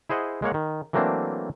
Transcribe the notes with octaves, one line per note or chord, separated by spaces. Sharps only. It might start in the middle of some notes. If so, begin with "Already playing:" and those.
E4 G#4 C5 D#5 F#5
G#3 A#3 C#5 F#5
D#3
E3 F#3 A3 A#3 C4 D4